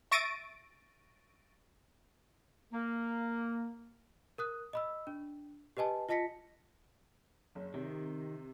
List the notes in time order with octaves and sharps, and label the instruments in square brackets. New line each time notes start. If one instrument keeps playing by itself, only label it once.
[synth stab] E5 C#6 A6 A#6 D7 D#7
[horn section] A#3
[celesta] A#4 D#6 F#6
D#5 B5 E6
D4
G4 B4 D#5 G#5 A5
F4 D#5 A5 A#6 B6 C#7
[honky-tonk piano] F#1
[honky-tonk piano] C3 [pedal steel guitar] D#3